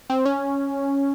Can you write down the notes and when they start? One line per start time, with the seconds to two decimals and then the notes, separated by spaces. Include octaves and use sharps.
0.10 C4
0.25 C#4